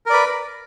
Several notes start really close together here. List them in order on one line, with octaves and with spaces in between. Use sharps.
A#4 D5 B4